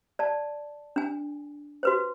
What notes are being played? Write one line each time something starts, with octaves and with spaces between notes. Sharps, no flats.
D5 A5
D4 G#5
F#4 B4 C5